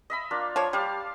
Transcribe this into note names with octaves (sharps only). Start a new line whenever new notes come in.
D#5 E5 B5
A#3 D4 F4
F3 C#5
G3 G4 F5 A5